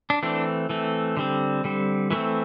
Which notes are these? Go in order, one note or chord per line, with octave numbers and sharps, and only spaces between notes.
D4
E3 A3 C4 D4
E3 A3 C4
D3 G3 C4
D3 G3 C4
E3 A3 C4 E4